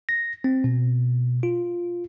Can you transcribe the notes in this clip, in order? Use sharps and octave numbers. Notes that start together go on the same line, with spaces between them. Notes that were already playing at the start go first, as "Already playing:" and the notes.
A#6
C4
B2
F4